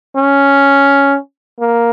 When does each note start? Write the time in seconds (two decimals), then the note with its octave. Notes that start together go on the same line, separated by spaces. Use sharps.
0.16 C#4
1.60 A#3